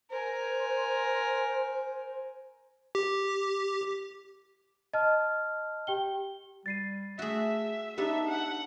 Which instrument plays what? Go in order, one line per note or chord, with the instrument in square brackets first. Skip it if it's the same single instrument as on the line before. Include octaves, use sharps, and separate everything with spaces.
[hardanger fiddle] A#4 G#5 [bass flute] C5
[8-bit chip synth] G4
[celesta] D#5 A5 F6
G4 G5 G7
[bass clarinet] G3 [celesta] A6 C7 D#7
[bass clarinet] A3 [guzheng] F#4 G#4 [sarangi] E5
[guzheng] B3 D4 A4 [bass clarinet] D#4 [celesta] G4 [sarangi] E5
[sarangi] F#5